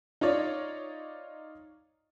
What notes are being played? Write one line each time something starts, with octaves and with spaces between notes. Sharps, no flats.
D#4 F4 C#5 D5